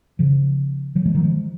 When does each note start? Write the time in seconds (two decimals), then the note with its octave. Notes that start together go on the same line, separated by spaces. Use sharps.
0.19 C#3 F3
0.95 D#3 F#3
1.06 F3 G#3
1.15 D#3 F#3
1.24 F3 G#3